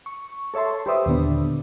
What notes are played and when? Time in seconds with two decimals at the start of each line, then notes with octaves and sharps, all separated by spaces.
0.06 C#6
0.54 A4 C#5 E5 A5 C6
0.86 G4 B4 C5 D5 E5 D#6
1.06 D#2 A#2 D3 B3 D4